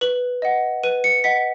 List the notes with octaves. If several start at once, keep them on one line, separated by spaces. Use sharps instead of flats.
B4 F#7
D#5 F#5
B4 D#7
C#7
D#5 F#5 B6